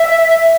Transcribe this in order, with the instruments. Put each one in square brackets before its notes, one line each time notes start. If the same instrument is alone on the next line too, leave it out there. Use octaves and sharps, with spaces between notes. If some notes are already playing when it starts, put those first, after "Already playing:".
Already playing: [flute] E5